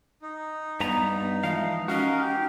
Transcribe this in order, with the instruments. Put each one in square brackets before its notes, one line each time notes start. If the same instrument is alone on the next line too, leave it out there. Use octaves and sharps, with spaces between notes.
[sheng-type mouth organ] D#4
[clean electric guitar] G2 B4 A#5 [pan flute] B3
[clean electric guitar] E3 F3 F5 [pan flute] G#3
[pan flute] C#4 [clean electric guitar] D#4 F#4 [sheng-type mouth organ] A#4 F5
[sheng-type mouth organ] G4